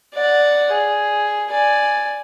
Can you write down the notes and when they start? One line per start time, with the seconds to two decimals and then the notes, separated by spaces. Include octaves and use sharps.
0.14 D5 F#5
0.72 G#4
1.49 D5 G#5